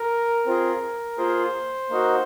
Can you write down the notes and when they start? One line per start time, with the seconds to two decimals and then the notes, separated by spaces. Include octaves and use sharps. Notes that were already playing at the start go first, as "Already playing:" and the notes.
Already playing: A#4
0.46 C4 F4 G#4
1.18 A#3 F4 G#4 C5
1.90 A#3 D#4 F#4